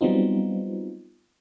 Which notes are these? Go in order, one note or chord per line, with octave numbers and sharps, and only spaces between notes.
F#3 G3 B3 C4 D#4 F4